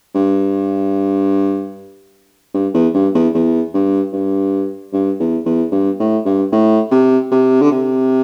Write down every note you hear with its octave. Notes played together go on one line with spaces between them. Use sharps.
G2
G2
E2
G2
E2
E2
G2
G2
G2
E2
E2
G2
A2
G2
A2
C3
C3
D3
C3